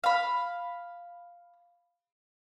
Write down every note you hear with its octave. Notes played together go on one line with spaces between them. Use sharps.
F5 B5